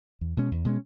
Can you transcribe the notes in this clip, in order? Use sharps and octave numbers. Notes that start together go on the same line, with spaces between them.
E2
B2 G#3 C#4
E2
B2 G#3 C#4